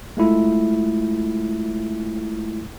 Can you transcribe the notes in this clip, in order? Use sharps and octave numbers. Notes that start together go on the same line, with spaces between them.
G#3 A3 E4 F4